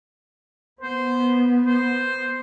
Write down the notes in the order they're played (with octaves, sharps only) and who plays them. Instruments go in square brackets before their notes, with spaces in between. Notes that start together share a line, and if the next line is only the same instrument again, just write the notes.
[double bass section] B3 [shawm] C5
[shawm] C5